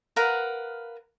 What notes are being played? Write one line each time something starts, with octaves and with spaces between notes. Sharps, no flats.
A#4 B4 F5 F#5